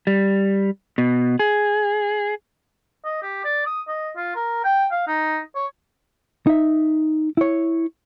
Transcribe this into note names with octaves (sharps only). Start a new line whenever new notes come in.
G3
B2
G#4
D#5
G4
D5
D#6
D#5
F4
A#4
G5
F5
D#4
C#5
D#4 E5
E4 C#5